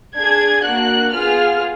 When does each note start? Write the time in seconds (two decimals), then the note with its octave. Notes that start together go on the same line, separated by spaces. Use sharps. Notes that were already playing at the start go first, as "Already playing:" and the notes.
0.16 D4 G#4 G#6
0.65 A#3 D4 F#4 F#6
1.14 B3 F4 G#4 F6